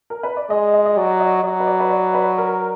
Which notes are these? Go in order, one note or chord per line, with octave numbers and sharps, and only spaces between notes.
A#4
B4
D5
G#3 D#5
D#5
D#5
F#3 D5
D#5
F#3 D#5
B4
D5
B4
D5
B4
A#4